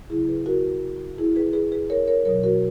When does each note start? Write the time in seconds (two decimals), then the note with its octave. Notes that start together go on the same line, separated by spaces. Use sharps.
0.10 C#3 F#3 E4 G#4
0.29 G#4 B4
0.46 F#4 A#4
1.18 E4 G#4
1.36 G#4 B4
1.53 G#4 B4
1.72 G#4 B4
1.90 A#4 C#5
2.07 A#4 C#5
2.25 B2 F#3 A#4 C#5
2.43 F#4 A#4